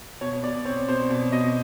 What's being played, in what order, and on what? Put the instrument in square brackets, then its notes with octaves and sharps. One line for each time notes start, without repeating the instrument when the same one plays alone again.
[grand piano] B2 C#5
B2 D5
C4 C#5
B2 C5
B2
B2 D#5